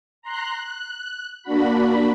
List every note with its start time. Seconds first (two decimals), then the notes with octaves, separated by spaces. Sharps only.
0.22 A#5 C6 F#6
0.54 F#6
1.43 A#3 D4 F#4 B5